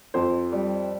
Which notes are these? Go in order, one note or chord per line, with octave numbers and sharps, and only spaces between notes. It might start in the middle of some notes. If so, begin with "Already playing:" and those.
F2 C5
G3